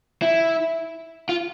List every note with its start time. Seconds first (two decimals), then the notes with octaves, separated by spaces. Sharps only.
0.22 E4
1.29 F4